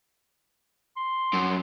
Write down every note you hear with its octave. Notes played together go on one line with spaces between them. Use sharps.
C6
F#2